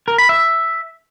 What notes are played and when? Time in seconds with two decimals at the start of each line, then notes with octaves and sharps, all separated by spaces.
0.08 A#4
0.18 B5
0.29 E5